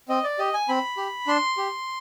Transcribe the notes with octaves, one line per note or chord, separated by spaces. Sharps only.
C4 D#5
D5
G4 D#5
G#5
C4 B5
G4
D4 C6
G4